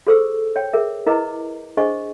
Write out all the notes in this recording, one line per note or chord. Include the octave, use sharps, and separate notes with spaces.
F#4 G#4 A4 C5 C#6 E6
C#5 G5
G#4 A#4 E5
E4 A#4 B4 D#5 A#5 D6
D4 G#4 C5 D#5 G#5 C#6